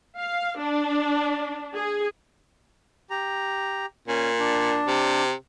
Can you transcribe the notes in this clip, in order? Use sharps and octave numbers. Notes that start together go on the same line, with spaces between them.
F5
D4
G#4
G4 A#5
A#2 C#4 G#5
D4
C3